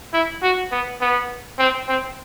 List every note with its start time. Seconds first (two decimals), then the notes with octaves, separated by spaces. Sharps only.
0.14 E4
0.43 F#4
0.72 B3
1.01 B3
1.59 C4
1.89 C4